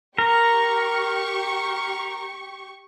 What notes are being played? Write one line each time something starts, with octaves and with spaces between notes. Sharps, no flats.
G4 A#4 C#6